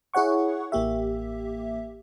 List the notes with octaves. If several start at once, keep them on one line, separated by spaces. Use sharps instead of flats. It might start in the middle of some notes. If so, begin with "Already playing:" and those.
E4 G#4 C#5 F#5 C#6
A1 A#3 G4 E5